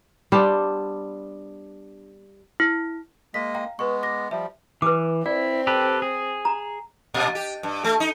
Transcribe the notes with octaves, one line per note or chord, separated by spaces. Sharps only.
G3 B3 D4 C5
E4
G#3 A#3 D#5 B6
F5 G5 A#5
G#3 B3 B4 C#6
D6 A#6
F3 G3 E5
E3 B4 D6
C4 E4 D5
G4 A4 B4
G#4
A#5
A#2
G4
G2
A3
D#4